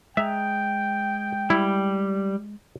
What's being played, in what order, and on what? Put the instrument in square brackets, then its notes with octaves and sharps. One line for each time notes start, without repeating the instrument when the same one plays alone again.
[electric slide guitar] G#3 G#4 A#5 [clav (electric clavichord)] E5 [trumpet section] G5
[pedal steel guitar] G3 [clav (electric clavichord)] E4